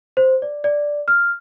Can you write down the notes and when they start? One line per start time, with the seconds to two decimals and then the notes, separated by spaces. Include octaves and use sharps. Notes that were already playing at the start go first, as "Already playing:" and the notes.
0.17 C5
0.42 D5
0.64 D5
1.08 F6